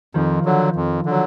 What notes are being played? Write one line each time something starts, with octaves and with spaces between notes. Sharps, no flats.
F2 D#3 F3
D3 F#3
F2
D3 F#3